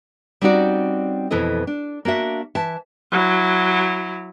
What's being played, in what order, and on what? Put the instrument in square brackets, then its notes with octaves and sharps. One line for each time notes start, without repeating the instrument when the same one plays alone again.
[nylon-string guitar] G3 C4 C#4 D#4 F#4 D5
F2 B2 E3 E4 A4 D#5
D4
A#3 D4 F#4 E5
E3 E5 A5
[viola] F#3 E4